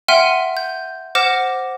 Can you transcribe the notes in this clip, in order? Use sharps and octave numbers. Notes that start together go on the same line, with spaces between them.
E5 F#5 G5 C6 F6 D#7
G6
C5 F#5 D6 F6 A#6 E7